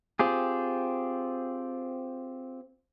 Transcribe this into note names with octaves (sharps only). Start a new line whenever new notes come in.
C4 F4 G4 G#4